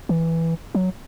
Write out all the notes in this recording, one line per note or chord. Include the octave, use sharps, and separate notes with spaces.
E3
F#3